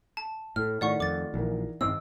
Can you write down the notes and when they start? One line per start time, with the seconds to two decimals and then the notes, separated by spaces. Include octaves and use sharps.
0.17 A5
0.56 A2 A4 F6
0.81 A2 D#3 A3 F4 D5 F#5 C#6
1.00 F2 D6 A6
1.34 A#1 E3 D#4 A#4
1.81 G2 D#3 C4 D#5 D6 E6